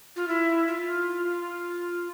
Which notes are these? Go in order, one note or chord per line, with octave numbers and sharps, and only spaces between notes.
F4
E4
F4